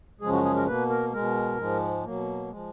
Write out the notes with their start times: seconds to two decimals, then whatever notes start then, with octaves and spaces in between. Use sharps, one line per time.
0.21 F#2 C#3 F3 G#3 G#4
0.32 F#4
0.44 G#4
0.56 A#4
0.67 B2 A#3 B4
0.89 A#4
1.13 B2 G#3 A#4
1.58 G#2 F3 G#3
2.05 B2 F#3 A#3
2.50 F3 G#3